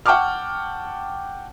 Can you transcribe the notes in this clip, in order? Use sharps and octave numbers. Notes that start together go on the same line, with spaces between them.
F#5 G5 A5 C#6 D6 F6